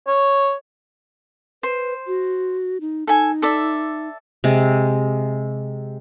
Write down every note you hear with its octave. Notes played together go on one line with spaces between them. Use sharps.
C#5
B4 C5
F#4
D#4
D#4 A4 G#5
A4 D5 E5
C3 G#3